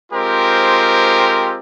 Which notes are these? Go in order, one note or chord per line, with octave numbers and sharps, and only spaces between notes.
G#3 C4 F4 G4 A#4 C5